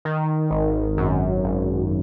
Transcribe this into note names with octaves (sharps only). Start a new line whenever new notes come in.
D#3
G#1
F#2
G#1